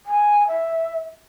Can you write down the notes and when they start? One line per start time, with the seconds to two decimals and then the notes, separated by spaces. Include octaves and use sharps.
0.06 G#5
0.48 E5